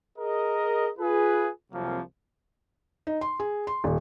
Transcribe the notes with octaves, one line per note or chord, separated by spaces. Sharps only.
G#4 A#4 D#5
F4 G#4 B4
C2 F2 C3 F3 F#3 A#3
D#4
C6
G#4
C6
D#1